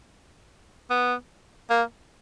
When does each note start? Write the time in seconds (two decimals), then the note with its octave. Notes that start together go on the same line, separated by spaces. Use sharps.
0.90 B3
1.70 A#3